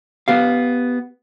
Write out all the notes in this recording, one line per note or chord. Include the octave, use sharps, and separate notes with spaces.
B3 G4 F5